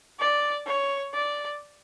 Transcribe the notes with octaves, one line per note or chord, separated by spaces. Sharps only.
D5
C#5
D5